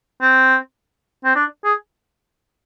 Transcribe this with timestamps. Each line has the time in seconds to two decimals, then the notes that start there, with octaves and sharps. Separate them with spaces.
0.21 C4
1.25 C4
1.35 D4
1.64 G#4